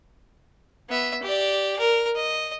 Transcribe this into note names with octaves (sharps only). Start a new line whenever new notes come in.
B3 E5
G4 D5
A#4
D#5